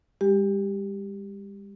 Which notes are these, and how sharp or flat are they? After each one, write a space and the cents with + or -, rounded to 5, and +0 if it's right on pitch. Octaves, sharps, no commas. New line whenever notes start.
G3 +45 G4 +0